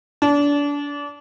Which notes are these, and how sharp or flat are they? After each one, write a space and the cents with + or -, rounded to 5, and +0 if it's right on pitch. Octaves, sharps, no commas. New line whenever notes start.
D4 -30